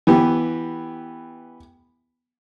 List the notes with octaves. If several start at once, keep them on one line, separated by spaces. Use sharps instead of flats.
E3 B3 G4